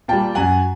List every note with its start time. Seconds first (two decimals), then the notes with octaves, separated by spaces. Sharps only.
0.08 A#2 G3 G5 A5
0.35 F#2 F#5 G#5